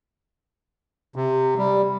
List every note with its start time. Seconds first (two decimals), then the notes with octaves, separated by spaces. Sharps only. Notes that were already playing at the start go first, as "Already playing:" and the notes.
1.16 C3
1.58 G3